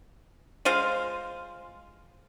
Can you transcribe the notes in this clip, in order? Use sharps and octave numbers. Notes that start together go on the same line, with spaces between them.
G#3 F4 C5 F5